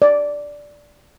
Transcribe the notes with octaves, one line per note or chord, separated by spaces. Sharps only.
D5